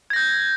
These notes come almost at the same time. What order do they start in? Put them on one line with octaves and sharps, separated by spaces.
G#6 A#6 G6